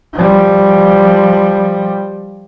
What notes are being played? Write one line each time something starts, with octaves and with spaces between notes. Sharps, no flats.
F3 G3